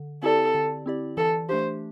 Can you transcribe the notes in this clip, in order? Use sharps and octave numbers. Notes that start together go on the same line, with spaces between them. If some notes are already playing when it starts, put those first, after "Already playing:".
Already playing: D3
C4 E4 G4 A4 D5
D3
C4 E4 G4 D5
E3 A4
A3 D4 G4 C5